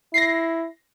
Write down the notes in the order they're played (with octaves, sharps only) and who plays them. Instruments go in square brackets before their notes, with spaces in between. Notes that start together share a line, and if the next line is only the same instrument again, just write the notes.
[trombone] E4 [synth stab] A#6 C7